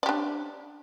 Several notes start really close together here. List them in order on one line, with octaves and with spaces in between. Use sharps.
D5 G4 D4